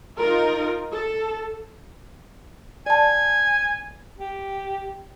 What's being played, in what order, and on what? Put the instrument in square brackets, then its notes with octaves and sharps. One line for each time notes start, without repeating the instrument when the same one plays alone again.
[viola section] D#4 F4 A#4
A4
[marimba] D5 A5 [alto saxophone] G#5
[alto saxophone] G4